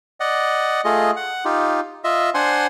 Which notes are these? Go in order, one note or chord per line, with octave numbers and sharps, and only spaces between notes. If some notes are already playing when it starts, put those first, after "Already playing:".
D5 D#5 F#5
A3 F4 G#4 D#5
F#5
D#4 F4 G4
F4 D#5 E5
D4 C5 F#5 G#5 C6